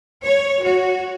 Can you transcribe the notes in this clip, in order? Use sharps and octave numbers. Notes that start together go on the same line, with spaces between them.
C#5
F#4